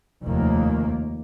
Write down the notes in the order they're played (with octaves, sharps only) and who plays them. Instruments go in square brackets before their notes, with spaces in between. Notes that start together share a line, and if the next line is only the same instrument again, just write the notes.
[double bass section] F1 D#2 D#3 A#3